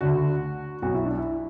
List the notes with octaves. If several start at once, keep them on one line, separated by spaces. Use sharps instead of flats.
D2 D3 F#4
B1 B2 F#4
E4
D4
E4